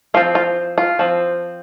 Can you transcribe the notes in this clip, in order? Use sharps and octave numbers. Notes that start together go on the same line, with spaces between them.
F3 C4 F4
F4
F4
F3 C4